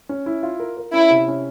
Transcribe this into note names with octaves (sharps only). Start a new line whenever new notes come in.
C#4
E4
F4
A#4
A#4
C#4 E4
C3
C#4